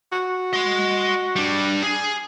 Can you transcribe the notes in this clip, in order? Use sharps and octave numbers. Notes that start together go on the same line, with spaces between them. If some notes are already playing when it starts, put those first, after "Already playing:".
F#4
D#5 C6
G3 D4
G#4